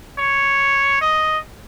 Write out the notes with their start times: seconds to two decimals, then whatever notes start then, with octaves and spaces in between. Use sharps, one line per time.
0.19 C#5
1.01 D#5